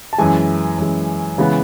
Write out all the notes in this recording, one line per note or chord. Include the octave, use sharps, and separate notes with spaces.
A5
F#2 E3 G#3 G#5
F#2 E3 G#3
C#3 E3 G#3 B3